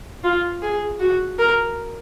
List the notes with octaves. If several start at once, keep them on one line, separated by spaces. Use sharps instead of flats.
F4
G#4
F#4
A#4